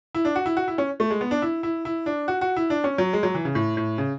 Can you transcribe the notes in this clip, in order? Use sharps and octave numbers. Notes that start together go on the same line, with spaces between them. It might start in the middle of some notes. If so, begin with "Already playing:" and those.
E4
D4
F#4
E4
F#4
E4
C#4
A3
G#3
B3
D4
E4
E4
E4
D4
F#4
F#4
E4
D4
C#4
F#3
G#3
F#3
E3
C#3
A2
A2
C#3